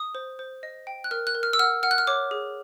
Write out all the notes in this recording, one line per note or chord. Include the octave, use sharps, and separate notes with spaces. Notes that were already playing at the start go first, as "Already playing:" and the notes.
Already playing: D#6
C5
C5
D#5
G5
F#6
A#4 F6
F#6
A#4
F6
E6
F#5 F6
F#5 F6
F#6
F6
C#5 D6
G#4